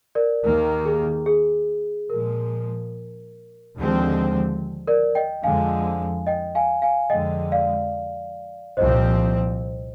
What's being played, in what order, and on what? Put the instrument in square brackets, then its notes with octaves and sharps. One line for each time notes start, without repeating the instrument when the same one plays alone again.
[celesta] A#4 D5
[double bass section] D#2 D#3 A#3 [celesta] A#4
[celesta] G#4
G#4
[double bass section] A#2 F3 G#3 [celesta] A#4
[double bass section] D#2 D3 F3 G#3 C4
[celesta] A#4 D5
D#5 G5
[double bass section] F2 D3 F3 G#3 [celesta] F5 G#5
[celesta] D#5 G5
F5 G#5
F5 G#5
[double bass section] F2 D3 G#3 [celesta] D#5 G5
[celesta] D5 F5
[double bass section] C2 A#2 F3 C4 [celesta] C5 D#5